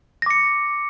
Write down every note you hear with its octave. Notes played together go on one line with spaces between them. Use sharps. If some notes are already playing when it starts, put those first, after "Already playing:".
D6 A#6 C#7